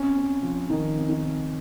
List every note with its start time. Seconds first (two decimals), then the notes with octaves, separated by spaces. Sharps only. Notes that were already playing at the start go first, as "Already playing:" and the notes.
Already playing: C4 C#4
0.17 C4
0.43 F3
0.69 D#3 F3 D#4
0.96 C4
1.09 D#3 D#4
1.23 C4